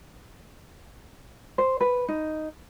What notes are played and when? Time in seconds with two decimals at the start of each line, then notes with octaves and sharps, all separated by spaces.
1.58 C5
1.81 B4
2.08 D#4